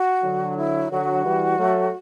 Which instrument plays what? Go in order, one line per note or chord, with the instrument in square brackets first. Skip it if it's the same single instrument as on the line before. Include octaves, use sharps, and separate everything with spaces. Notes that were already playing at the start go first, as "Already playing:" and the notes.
Already playing: [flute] F#4
[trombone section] D3 F#3
[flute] E4
[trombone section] D3 F#3 [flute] F#4
[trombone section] E3 G3
F#3 A3